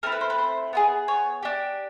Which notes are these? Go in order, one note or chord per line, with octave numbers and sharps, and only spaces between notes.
A3 C4 E4 A#4
B4
C5
B4
C5
B3 E4 G#4
C#5
D4 G4